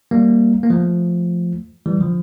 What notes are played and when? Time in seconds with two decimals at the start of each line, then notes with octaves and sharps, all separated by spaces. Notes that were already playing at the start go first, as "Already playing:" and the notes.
0.11 G3 A#3
0.63 A#3
0.70 F3 A3
1.86 E3 G3
2.01 D3 F3